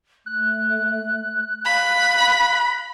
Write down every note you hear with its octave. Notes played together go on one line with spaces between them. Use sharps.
A3 F#6
F5 B5